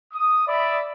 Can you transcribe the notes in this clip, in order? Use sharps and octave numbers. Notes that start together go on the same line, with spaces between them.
D#6
D5 E5 B5